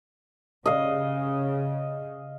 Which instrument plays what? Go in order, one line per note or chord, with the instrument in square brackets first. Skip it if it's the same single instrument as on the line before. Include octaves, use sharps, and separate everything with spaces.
[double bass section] C#3 [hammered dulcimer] D#5 F5